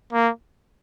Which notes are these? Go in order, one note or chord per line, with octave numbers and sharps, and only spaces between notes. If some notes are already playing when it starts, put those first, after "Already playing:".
A#3